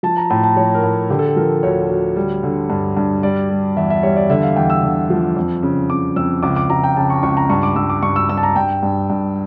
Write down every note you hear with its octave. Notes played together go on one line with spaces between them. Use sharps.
F3 A5
A#5
A2 A5
A5
F3 C#5
A#4
A2
D3 G4
A4
G4
F3 A#4
D2 C#5
D2
G3
D3
G2
G2
G3 D5
G3
E2 E5
E5
G3 C#5
D5
D3 E5
F5
E2 G5
E6
D3
F3
F2
C#3
C#3 D6
F2 E6
C#2 D6
D6
C#2 A#5
G5
C#3 A5
C#6
C#2 C#6
A#5
G2 C#6
D6
G2 E6
D6
G2 C#6
E6
G2 E6
A5
A#5
G2 G5
G2
G2